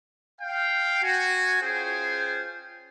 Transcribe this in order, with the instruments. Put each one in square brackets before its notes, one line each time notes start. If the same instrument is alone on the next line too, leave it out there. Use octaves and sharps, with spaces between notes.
[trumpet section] F5 G5
F#4 G#5
C#4 F4 G#4 C5 G5 G#5